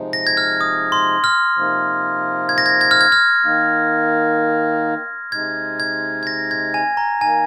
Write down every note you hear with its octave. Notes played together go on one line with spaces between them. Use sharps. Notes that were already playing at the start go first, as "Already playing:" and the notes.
Already playing: C3 F3 G#3 D#4
A#6
G#6
F6
D#6
C6
F6
C3 F3 A#3 D#4
G#6
A#6
G#6
G#6
F6
G#6
F6
D#3 A#3 D#4
C3 G#3 D#4 G#6
G#6
G#6
A#6
G#6
G#5
A#5
D#3 A#3 D#4 G#5